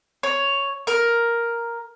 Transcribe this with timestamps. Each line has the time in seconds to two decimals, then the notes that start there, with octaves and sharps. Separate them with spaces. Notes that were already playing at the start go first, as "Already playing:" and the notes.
0.23 C#5
0.87 A#4